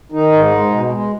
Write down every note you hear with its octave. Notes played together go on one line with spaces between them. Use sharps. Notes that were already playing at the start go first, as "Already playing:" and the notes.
D#3 D#4
G#2
G#3
B2
G#3